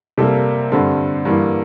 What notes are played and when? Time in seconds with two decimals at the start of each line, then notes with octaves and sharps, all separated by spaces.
0.18 C3 G3 A#3 A4
0.72 G2 D3 G3 C4 A4
1.25 G2 E3 A#3